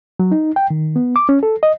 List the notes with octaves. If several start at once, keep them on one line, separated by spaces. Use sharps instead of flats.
F#3
D#4
G5
D#3
B3
D6
C#4
A4
D#5